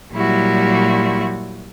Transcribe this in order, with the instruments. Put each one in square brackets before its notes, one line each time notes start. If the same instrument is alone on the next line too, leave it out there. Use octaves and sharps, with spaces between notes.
[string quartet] A#2 F#3 G3 E4 F#4